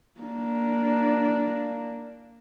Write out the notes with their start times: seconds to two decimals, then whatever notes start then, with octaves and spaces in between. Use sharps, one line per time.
0.20 A#3 D4